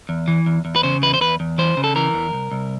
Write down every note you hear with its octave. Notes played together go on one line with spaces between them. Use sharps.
E2
E3
E2
E2
B4
C#3 C5
E2 B4
C5
E2 B4
E2
E3 C5
C#3
A4
E3 A#4
E2
C2
C2